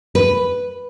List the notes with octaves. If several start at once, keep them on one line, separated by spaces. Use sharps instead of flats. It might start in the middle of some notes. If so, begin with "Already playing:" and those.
B4